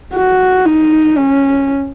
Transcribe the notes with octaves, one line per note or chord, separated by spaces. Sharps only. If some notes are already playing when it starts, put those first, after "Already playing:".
F#4
D#4
C#4